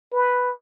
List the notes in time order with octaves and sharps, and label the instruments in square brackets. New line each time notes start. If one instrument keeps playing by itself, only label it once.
[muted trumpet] B4